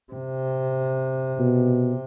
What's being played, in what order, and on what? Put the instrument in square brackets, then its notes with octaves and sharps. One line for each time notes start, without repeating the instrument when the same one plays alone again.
[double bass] C3
[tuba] B2